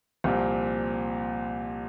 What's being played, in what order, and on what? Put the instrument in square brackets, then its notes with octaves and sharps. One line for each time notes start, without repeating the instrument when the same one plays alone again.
[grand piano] C2 A#2 F3 C4